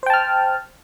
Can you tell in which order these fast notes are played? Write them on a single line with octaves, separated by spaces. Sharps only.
C5 G5 A5 F6